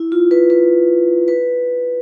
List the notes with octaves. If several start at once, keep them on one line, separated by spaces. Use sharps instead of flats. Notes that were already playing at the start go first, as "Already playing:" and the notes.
Already playing: E4
F4
B4
B4
B4